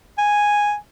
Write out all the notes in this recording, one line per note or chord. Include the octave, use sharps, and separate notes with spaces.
G#5